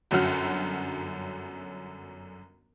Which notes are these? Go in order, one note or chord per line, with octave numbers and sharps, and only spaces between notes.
G1 F#2 D3 C#4 F#4 F6